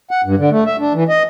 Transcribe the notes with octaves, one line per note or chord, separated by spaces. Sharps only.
F#5
G2
D3
A3
E5
D4
E3
D#5